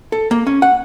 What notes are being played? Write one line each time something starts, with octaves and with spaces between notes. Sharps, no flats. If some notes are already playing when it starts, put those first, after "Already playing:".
A4
A#3
C#4
F#5